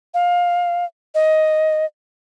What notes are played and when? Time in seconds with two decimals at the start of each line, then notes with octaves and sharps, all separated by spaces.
0.14 F5
1.15 D#5